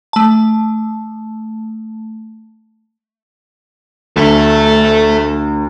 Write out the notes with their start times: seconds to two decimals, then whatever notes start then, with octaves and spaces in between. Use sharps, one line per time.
0.13 A3 A5
4.16 D2 A4 E5